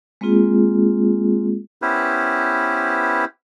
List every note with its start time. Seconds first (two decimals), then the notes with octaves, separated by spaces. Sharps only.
0.21 G#3 A#3 C4 F4 G#4
1.82 B3 C#4 E4 G4 B4 C5